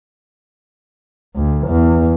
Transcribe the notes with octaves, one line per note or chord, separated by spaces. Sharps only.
D2
E2